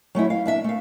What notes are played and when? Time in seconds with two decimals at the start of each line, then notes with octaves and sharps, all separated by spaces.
0.15 F#3 A3 C#4 E4
0.30 F5
0.46 A#3 D4 E5
0.64 A3 F5